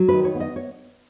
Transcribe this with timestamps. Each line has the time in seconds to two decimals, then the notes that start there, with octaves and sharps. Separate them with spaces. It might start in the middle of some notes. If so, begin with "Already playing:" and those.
Already playing: F#3
0.09 B4
0.14 D#3
0.24 C#5
0.35 B3
0.40 D#5
0.56 C#5